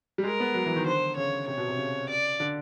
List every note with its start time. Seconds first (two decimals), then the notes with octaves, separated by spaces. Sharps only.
0.18 G3
0.23 G#3 A#4
0.40 B3
0.54 F#3
0.66 E3
0.76 D#3
0.85 D3 C5
1.16 C#3 C#5
1.47 C3 C#5
1.58 B2
1.69 C3
1.78 C#3
2.09 D5
2.40 D3